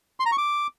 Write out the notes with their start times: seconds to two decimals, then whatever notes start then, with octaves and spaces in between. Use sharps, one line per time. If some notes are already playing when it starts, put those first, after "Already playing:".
0.20 C6
0.26 A#5
0.32 C#6
0.38 D6